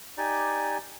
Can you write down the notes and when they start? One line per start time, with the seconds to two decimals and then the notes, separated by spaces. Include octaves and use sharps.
0.17 D#4 G4 D5 G#5